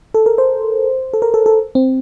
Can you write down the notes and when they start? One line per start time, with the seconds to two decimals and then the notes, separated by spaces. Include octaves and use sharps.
0.14 A4
0.26 A#4
0.38 C5
1.13 A4
1.22 A#4
1.34 A4
1.46 A4
1.75 C4